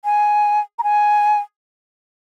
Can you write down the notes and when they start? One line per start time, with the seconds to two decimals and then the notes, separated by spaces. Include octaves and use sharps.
0.05 G#5
0.79 A#5
0.83 G#5